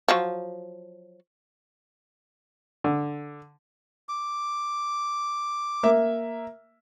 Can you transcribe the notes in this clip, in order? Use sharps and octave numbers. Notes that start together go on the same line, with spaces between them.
F3 F#3
D3
D6
A#3 E5